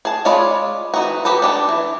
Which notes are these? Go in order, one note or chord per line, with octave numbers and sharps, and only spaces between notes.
G#4 A5
G#3 F4 C#5 D5 B5
E3 D#4 F#4
F#4 G4 A4 B4
D4 G4 A5
E3